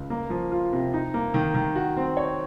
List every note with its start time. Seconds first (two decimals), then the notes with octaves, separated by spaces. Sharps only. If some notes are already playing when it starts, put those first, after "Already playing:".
Already playing: C#2
0.10 A#3
0.30 F3
0.51 F4
0.73 C3
0.93 D#4
1.14 A#3
1.34 D#3
1.55 D#3
1.75 F#4
1.97 C4
2.17 C#5